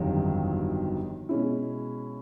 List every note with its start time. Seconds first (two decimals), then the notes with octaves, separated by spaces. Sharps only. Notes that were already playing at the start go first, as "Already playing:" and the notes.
Already playing: G1 F2 C3 D#3 F#3
1.29 B2 G#3 C#4 E4